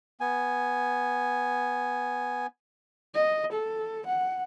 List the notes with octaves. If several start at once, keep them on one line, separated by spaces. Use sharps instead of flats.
B3 G#5
D#5
A4
F#5